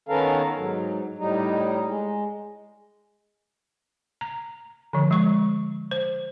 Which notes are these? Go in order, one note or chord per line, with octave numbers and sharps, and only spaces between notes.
D#3 B3 C#4 A4 A#4 F5
G#2 F#3
A2 G3 D#4
G#3
A#5
D3 F3
G#3 C#6
C5